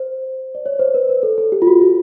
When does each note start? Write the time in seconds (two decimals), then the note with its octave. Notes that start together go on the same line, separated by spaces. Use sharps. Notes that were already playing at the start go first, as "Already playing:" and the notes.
Already playing: C5
0.55 D5
0.66 C#5
0.79 C5
0.94 B4
1.09 B4
1.23 A4
1.38 A4
1.52 G4
1.62 F4
1.67 F#4
1.81 F#4